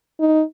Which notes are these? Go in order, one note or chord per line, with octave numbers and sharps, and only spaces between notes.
D#4